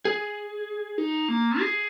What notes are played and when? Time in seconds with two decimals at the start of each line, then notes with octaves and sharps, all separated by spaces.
0.05 G#4
0.98 D#4
1.29 A#3
1.60 G#4